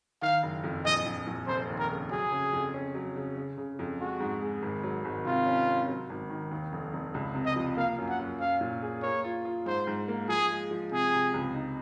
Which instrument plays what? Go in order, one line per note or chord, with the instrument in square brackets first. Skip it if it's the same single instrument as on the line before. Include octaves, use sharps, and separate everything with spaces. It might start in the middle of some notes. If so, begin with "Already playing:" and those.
[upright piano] D#3 [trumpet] F5
[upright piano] F#1
F2
[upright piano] A#1 [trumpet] D#5
[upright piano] A#1
A#1
[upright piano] F1 [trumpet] C5
[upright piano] D#2
[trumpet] A#4
[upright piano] C#3
[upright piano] F#3 [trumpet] G#4
[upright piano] C#3
F2
C#4
F#3
C#3
C#3
C#3
F2
[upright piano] G#3 [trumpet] F#4
[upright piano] G#2
G#3
G#1
F#3
G#1
[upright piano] C3 [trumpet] F4
[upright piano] C#4
C#4
F#3
G#1
D#3
D#2
F1
F1
C#2
C3
[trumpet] D#5
[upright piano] F3
[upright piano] A#3 [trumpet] F5
[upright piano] F#2
[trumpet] F#5
[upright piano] F#2
[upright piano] C#4 [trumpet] F5
[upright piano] A#2
G#4
[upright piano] A#3 [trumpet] C#5
[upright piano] F4
F4
[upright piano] G#2 [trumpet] C5
[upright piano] G#2
A#3
[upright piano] F3 [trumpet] G#4
[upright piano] G#3
F3
[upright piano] C3 [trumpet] G#4
[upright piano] C3
C#2
D#4